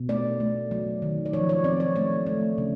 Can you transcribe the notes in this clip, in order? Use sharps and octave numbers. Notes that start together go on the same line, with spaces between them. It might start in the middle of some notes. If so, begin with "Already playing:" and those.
Already playing: B2
A3 D5
A3
F#3
D#3
D5
F3 C#5
C#5
C4 D5
C#5
A3 C#5
A3
C#3